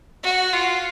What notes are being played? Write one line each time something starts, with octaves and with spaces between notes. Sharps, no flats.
F#4
F4